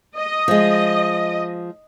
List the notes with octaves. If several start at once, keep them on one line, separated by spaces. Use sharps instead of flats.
D#5
F3 G#3